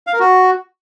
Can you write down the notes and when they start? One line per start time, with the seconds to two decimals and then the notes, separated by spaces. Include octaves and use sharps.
0.07 F5
0.13 A#4
0.20 F#4